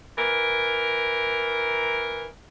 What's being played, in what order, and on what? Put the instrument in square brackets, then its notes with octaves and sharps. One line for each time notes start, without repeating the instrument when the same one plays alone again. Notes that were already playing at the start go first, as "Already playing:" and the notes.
[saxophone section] E3 A#4